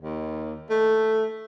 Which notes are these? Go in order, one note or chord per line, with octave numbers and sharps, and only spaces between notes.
D#2
A3